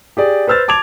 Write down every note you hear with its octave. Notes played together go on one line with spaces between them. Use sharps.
G4 G#4 D5
B4 C5 E6 F6 A6
A5 D6 G#6 F7